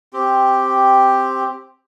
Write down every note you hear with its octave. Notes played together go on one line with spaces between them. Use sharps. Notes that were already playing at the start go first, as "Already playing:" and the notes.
C4 G4